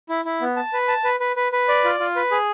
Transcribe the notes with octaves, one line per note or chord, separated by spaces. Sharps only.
E4
E4
B3
A5
B4
A5
B4
B4
B4
B4
D5
F4
F4
B4
G#4